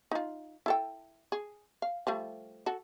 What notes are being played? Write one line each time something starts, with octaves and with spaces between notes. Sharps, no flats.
D#4 F4
E4 A4 G5
G#4
F5
F3 G3 A3
F#4 A4